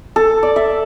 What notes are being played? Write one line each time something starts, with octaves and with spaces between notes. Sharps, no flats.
A4
D5
E5